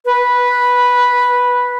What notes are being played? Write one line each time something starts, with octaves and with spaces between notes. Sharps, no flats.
B4